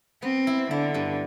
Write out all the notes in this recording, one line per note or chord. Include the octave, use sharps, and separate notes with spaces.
B3 C4
E4
D3 E4
G2